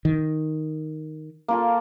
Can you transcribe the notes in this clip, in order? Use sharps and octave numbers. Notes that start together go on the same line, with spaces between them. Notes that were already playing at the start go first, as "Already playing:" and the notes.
D#3
A#3 F4 A4